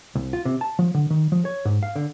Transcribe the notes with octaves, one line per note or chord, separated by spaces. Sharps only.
C2
F4
C3
A5
F3
D3
D#3
F3
C#5
G#2
F5
D3